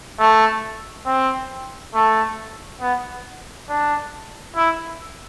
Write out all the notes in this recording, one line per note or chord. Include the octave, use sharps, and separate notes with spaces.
A3
C4
A3
B3
D4
E4